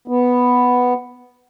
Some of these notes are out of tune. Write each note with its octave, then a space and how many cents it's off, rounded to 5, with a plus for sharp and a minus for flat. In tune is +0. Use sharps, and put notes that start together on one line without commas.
B3 +0